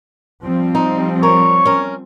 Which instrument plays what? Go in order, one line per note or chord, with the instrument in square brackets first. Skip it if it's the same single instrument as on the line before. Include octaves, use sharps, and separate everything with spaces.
[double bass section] F3 G3 C4
[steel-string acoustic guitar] D#4
[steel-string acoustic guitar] A#4 [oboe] C#5
[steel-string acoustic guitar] C#4 A#4